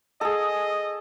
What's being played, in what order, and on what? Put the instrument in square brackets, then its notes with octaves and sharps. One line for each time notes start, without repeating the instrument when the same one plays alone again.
[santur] G#4 A4 [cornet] D#5